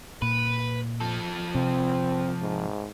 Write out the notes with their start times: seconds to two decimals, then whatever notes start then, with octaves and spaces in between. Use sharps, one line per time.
0.22 A#2 B4
1.01 F3 A4
1.55 C3 C4
2.41 G#2